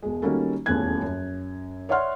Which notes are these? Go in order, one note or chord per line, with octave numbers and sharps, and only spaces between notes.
E1 G#3
D#3 G3 A#3 C#4 F#4 A4
D#1 E2 A3 C#4 F#6 G#6
F#2
C#5 D5 E5 F#5 C6 F6